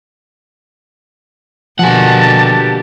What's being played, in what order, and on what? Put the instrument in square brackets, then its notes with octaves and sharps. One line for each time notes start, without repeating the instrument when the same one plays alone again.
[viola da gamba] B2 D3 A#3 [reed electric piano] F3 G#5 [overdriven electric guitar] G4 F#5 [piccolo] A5